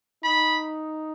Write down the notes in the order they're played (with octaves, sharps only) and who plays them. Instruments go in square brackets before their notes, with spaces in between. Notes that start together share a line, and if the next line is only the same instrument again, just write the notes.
[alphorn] D#4 [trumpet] B5